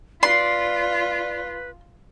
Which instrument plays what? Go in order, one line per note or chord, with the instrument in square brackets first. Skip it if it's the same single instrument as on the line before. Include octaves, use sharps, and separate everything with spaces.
[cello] F4 [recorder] B4 [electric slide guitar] D5 [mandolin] C6